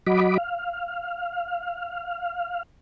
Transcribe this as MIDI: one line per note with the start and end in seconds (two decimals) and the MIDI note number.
0.07 0.38 54
0.07 0.38 66
0.07 0.38 75
0.07 0.38 83
0.07 0.38 86
0.38 2.63 77